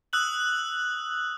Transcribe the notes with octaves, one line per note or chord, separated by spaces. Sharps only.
D#6 E6 F#6 F#7